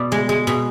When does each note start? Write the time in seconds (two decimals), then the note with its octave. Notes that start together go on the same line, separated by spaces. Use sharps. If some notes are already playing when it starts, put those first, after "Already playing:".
Already playing: B2 D5
0.12 G#3
0.29 G#3
0.47 B2